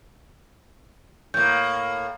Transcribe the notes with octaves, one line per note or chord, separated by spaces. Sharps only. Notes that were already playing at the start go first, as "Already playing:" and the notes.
A2 A#3 G6